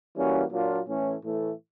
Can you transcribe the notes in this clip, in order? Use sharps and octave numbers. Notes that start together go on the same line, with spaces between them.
E3 G3 A#3 C#4 F#4
A#2 F#3 A#3 D4 F4
A2 E3 A3 C#4
A2 E3 A3